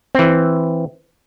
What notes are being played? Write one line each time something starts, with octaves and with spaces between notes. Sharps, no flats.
E3 C4